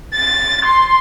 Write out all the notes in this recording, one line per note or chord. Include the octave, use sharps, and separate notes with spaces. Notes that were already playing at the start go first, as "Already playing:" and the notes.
A6
C6